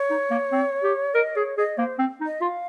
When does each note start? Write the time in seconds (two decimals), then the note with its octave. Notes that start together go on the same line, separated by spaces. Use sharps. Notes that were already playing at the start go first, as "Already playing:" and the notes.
Already playing: C#5
0.10 D#4
0.31 A#3
0.52 C4
0.83 G4
1.14 A#4 D#5
1.36 G#4 C#5
1.57 G#4 D#5
1.78 A#3 C5
1.99 C4
2.21 D#4
2.26 D#5
2.41 F4 F5